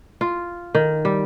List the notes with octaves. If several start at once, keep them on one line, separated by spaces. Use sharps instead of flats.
F4
D#3
G3